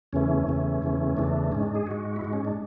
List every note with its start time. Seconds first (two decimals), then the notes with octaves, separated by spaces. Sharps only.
0.13 E2 C#3 E3 A3 C#4
0.47 E2 C#3 E3 A3
0.82 E2 C#3 E3 A3
1.17 E2 C#3 E3 A3 D4
1.52 G#2 G#3 C#4
1.63 D4
1.75 G#4
1.87 G#2 G#3 F#4
2.16 E4
2.21 G#2 G#3 F#4
2.33 C#4
2.45 D4